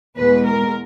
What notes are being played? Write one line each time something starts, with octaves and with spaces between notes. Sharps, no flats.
E2 B2 G#3 B4
A#4